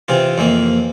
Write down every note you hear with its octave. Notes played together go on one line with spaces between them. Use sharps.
C3 E3 F4
F2 E3 A#3